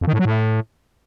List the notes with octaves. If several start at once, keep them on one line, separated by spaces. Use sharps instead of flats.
F2
D#3
A2
F#3
A2